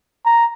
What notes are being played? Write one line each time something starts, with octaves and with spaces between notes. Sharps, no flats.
A#5